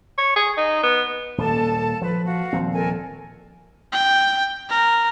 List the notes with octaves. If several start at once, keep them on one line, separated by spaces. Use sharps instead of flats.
C#5
G#4
D#4
B3
D#1 A#3 A4 A5
F3 B4
F#4 F5
D#1 F3 C4
A4 A#4 G#5
G5
A#4